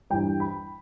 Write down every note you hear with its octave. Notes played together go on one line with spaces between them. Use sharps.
G2 E3 G3 G5
B5